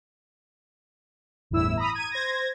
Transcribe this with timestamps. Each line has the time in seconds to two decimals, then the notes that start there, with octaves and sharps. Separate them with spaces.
1.50 G1 E2 A2 E4 E6
1.77 A#5 B5 D#6
1.95 G#6 D#7
2.12 C5 G#6 A#6